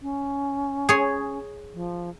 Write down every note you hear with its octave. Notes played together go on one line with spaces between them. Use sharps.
C#4
G#4 C#5
F3